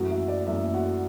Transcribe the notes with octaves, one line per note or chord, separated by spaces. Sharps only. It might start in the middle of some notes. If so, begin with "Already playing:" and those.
Already playing: F#2 E3 A3 F#4 F#5
E5
D5
F#2 E3 A3 E5
F#4 F#5